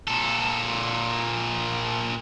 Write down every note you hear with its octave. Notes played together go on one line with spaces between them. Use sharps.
A#2 A4